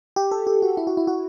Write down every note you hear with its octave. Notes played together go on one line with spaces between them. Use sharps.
G4
A4
G4
F#4
E4
F#4
E4
F#4